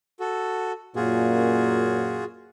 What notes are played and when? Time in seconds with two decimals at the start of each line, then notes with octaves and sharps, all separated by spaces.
0.20 F#4 A4
0.96 F#2 A#2 F4 F#4 G#4